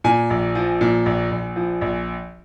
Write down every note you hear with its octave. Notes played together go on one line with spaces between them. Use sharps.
A#2 G#5
A#1
F3
A#2
A#1
A#1
F3
A#1